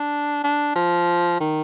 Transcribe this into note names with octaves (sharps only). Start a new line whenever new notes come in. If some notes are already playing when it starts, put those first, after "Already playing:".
Already playing: D4
D4
F3
D#3